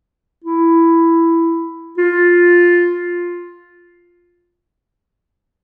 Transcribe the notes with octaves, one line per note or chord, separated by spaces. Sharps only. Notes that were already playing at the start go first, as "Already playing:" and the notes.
E4
F4